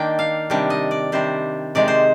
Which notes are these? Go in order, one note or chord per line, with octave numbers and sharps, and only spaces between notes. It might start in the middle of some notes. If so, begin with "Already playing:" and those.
Already playing: D#3 A#3 D4 G5
F5
C3 D#3 G3 D4
D#5
D5
C3 D#3 G3 D4 C5
C3 D#3 G#3 D5
C5